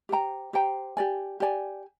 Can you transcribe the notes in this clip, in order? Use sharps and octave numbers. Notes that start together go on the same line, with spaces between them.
G4 C5 G5 A#5
G4 C5 G5 A#5
G4 D5 G#5
G4 D5 G#5